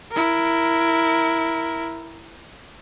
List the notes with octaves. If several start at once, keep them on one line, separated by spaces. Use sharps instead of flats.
E4 A#4